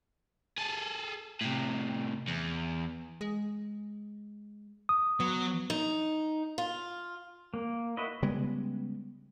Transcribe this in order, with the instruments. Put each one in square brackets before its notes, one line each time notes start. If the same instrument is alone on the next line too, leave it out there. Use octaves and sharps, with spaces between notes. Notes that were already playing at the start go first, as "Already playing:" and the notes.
[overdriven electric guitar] G#4 A4
A2 C3
E2
[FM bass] G#3
[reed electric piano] D#6
[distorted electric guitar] F#3 [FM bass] B3
[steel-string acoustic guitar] D#4
F4
[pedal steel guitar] A#3
E4 F#4 B4 D#5
[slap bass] C#3 G3 G#3 B3